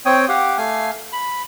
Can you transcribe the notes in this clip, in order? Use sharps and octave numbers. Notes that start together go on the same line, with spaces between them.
C4 C#5 G5 D#6
G4 F5 F#5
A3 F5 G#5
B5